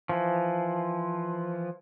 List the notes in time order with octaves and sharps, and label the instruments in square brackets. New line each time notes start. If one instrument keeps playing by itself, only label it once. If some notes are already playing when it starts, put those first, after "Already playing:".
[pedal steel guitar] E3 F3